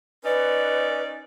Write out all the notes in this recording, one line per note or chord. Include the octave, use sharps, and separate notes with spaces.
C#4 D#4 B4 D5